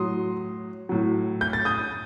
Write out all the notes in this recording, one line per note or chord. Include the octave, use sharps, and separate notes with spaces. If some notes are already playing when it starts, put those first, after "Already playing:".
Already playing: A2 F#3 C6 D#6
A2 F#3
G6
A6
D#6 G6